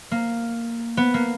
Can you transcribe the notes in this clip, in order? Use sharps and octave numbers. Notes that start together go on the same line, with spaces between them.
A#3
B3
A#3